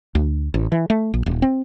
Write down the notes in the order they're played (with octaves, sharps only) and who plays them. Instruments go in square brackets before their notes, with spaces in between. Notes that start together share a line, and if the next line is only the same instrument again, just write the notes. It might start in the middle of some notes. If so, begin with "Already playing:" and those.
[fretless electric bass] D2
A1
E3
A3
A#1
D#1
C4